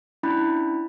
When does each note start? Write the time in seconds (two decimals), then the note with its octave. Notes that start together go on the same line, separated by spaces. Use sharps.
0.23 C#4 D4 E4 B5